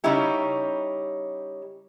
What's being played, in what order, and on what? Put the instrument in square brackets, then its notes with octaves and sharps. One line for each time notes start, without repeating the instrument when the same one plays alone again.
[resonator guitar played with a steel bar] C#3 G3 C#4 D#4 E4 G4